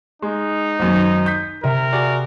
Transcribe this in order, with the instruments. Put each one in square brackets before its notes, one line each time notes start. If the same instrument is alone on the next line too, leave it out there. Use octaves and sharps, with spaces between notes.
[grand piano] G#3 [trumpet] D#4
[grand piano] G#1 F#2
G6 B6
[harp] C3 E5 [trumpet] A#4
[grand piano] F#4 G#4 D5